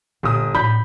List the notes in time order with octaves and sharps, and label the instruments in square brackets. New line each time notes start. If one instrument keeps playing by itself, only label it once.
[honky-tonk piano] G1 D#6 [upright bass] A#2
[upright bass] A2 D4 [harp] B5 [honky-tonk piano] G6